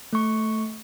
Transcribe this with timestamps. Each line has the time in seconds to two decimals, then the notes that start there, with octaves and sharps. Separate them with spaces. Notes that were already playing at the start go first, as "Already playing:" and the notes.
0.13 A3 C#6